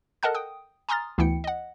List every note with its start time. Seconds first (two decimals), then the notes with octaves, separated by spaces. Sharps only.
0.23 A4 A#4 D#5 F#5 A5 F#6
0.35 G5 D#6
0.89 G#5 A#5 C6 D#6 F6 A6
1.18 D2 E3 B3 E4 G5 C#7
1.44 D#5 F#5